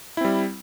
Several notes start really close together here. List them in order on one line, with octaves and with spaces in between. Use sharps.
E4 C4 G3